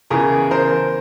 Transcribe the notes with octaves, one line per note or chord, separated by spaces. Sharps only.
E2 C#3 E3 G#4 A#4
A#4 C5